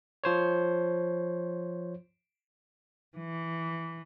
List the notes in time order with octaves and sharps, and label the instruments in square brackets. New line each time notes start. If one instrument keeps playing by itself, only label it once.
[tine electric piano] F3 C5 C#5
[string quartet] E3